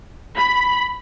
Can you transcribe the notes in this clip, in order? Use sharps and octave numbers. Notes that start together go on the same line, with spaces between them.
B5